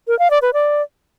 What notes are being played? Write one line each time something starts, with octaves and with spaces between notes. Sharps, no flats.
A#4
F5
D5
B4
D5